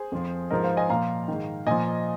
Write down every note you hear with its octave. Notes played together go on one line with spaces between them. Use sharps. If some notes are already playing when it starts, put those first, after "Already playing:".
Already playing: G#4 C5
F2 F3
G#2 F3 A#4 D#5
C5 F5
D#5 G#5
A#2 F3 F5 A#5
G#2 D#3
A#2 F3 D#5 G#5